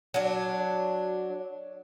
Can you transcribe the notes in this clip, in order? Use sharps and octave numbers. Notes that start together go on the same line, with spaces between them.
F#3 D4